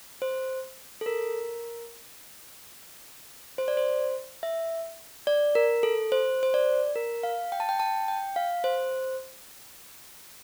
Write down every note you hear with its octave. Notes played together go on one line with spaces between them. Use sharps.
C5
A4
A#4
C5
D5
C5
E5
D5
A#4
A4
C5
C5
D5
A#4
F5
G5
A5
G5
A5
G5
F5
C5